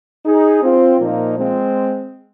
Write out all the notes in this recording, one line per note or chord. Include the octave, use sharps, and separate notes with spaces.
D#4 G#4
C4 F4
A#2 F3 A#3 D#4
G#3 C4